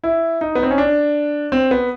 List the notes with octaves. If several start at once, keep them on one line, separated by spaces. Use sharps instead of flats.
E4
D#4
B3
C4
C#4
D4
C4
B3